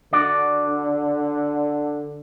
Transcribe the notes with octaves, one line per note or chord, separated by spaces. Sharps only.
D3 F#4 D5